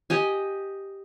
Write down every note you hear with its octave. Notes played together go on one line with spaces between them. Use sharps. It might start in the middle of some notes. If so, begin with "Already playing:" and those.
G4 D#5 G#5